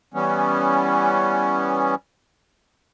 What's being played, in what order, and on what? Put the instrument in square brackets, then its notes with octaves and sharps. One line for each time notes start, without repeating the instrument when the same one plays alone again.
[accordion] E3 G3 B3 C#4